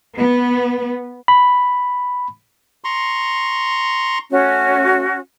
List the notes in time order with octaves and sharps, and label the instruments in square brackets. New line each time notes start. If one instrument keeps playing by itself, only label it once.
[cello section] B3
[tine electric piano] B5
[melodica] A#5 C6 C#6
[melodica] A3 [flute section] C#4 F#4